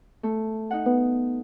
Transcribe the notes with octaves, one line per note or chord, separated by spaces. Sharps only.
A3
D#4 F#5
B3